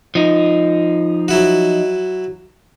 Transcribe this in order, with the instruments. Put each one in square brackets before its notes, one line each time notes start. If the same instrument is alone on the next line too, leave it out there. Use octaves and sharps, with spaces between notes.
[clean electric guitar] F3 D#4
[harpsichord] F#3 E4 F#4